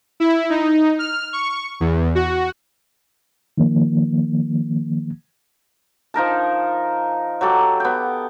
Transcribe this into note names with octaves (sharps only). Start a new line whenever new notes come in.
E4
D#4
F6
C#6
E2
F#4
D#3 F3 A#3
F3 D#4 A#4 A5
F#3 G4 A4 D6
B3 G5